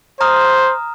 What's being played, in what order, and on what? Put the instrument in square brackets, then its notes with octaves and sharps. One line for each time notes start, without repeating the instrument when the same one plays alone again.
[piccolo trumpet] C5 [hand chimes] A#5 D#6 F6